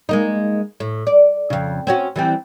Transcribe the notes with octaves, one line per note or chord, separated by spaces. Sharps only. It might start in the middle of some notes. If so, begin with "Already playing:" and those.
G#3 A#3 D#4
A2
D5
F2 C#3
C4 C#4 F#4
E3 G3 C4